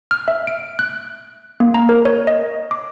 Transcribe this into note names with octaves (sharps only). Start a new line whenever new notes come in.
F6
E5
D7
F#6
A#3
A#5
A#4
C#5
D#5
D6